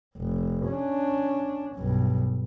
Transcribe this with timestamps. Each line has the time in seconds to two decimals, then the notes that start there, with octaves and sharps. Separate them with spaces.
0.17 F1
0.67 C#4 D4
1.76 B1 G2